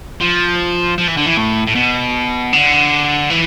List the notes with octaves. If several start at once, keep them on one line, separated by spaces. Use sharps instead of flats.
F3
F3
E3
D3
E3
A2
A2
B2
D3
E3